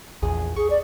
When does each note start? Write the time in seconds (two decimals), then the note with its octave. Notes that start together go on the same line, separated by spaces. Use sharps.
0.22 A#1 E2 G#4
0.56 G#4 C#6
0.70 D5